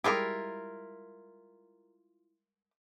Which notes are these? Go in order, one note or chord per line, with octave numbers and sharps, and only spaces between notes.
G3 G#3 E4 F4 G4 A#4